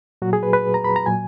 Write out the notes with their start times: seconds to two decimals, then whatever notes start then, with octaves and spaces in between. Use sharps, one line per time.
0.22 A#2 F#3 F#4
0.33 G#4
0.43 B4
0.53 B4
0.74 A#5
0.84 B5
0.96 A#5
1.06 A#2 F#3 G#5